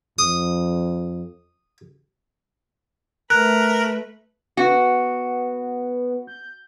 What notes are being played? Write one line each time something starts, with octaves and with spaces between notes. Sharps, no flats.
F2 D#6
A3 A#4 B4 F#6
B3 F#4
G6